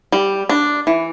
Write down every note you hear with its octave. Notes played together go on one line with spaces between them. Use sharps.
G3
D4
E3